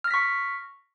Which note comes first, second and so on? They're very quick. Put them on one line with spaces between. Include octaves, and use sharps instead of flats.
F6 A#6 B6 C#6